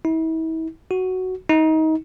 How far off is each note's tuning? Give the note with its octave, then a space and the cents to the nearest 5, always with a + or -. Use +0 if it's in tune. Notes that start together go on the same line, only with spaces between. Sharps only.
E4 -40
F#4 +5
D#4 +25